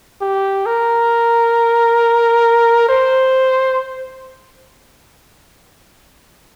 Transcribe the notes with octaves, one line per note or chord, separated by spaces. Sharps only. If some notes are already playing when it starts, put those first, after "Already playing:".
G4
A#4
C5